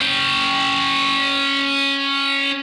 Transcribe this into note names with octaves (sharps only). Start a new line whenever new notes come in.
C#4 G5